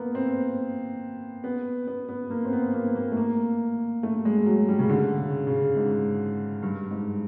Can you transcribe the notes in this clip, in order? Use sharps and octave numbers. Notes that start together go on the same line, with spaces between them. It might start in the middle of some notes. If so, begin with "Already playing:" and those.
Already playing: A#3 B3
C4
B3
B3
B3
A#3
C4
B3
A#3
A#3
A3
A#3
A3
G#3
F#3
G3
C#3
D3
C#3
C#3
G#2
G2
G#2